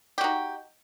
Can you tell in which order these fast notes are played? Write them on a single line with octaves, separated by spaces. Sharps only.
G4 F#4 D#4